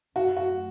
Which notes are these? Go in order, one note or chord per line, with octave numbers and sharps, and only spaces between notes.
F#2 F#3 A3 F#4
F#4